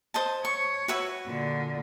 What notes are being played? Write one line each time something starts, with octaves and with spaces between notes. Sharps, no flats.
C5 D#5 A5
C#5 C#6
F#4 B4 E5
A#2 D3